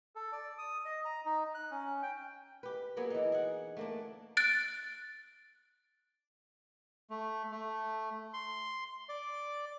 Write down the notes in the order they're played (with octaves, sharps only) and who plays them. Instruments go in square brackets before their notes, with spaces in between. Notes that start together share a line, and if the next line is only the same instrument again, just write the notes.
[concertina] A4
D5
D#6
D#5
A#5
D#4
F#6
C#4
G5
[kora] G4 B4
F#3 A#3 B3 G#4
E3 D#4
G#4 F#5
A3 A#3 D4
[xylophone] F#6 A6 D7
[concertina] A3
A3
C6
D5